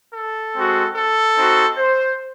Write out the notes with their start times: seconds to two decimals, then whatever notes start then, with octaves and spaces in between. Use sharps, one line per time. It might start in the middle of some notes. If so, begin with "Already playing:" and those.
0.14 A4
0.55 G#3 C4 F#4
0.95 A4
1.36 C4 D#4 F#4
1.77 C5